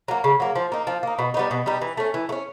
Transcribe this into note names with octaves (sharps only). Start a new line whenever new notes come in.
F#3 A#3
C#3
F#3 A#3
F3
A#3 D#4
F3
A#3 D#4
B2
G3 B3 D#4
B2
G3 B3 D#4
E3
A3 C#4
E3
A3
C#4